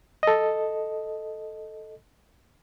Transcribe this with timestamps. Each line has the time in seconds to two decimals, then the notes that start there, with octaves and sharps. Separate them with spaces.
0.23 A4 D#5